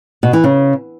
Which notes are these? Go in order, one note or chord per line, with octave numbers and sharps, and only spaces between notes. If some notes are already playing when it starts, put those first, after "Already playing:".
B2
E3
C#3